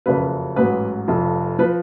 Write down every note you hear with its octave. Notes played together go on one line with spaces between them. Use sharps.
F#1 F2 C#3 F#3 B4
A1 G#2 F#3 B4
F1 F2 F3
F3 B4